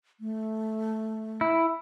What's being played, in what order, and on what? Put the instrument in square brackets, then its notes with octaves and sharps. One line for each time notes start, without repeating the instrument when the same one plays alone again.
[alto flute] A3
[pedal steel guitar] E4